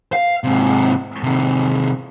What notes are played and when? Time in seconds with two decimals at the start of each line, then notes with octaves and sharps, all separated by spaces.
0.13 F5
0.44 G#2 C3
1.23 C3 D#3